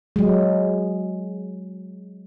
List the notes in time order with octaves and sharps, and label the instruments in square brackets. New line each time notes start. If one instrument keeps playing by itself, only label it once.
[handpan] F#3 G#3